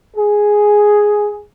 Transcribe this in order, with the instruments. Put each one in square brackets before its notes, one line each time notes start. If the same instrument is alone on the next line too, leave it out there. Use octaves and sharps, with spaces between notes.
[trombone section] G#4